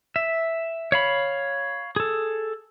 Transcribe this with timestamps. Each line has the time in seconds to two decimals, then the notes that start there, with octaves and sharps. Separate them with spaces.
0.16 E5
0.92 C#5 F5 B5
1.96 G#4 A4